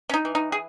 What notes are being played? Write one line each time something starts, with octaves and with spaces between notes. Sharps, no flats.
C#4
D#4
E3
D#4
G#4